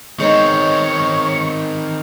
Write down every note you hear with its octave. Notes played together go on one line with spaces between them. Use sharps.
D#3 G#3 B3 C4 D#4 C#5 C#6